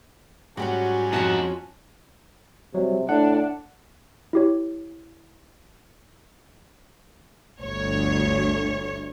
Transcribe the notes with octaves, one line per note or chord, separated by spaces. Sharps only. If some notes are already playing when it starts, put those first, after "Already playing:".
G#2 F#3 G3 C#4 F#4 G4 F#5
F2 D#4 F#4 D#5 F#5 A5
C3 F#3 G3
A2 D4 F#5
E4 G4 C#5
G1 D2 C#5